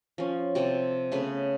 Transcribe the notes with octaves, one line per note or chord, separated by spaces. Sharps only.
F3 C#4
C3 C4 A4 D5
C#3 A3 B3 B4